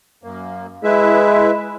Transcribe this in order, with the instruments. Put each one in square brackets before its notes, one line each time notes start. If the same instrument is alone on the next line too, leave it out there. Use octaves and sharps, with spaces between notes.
[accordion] F#2 A#3
[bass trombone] G#3 [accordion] E4 B4 E5